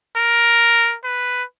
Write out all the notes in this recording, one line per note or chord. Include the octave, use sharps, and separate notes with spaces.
A#4
B4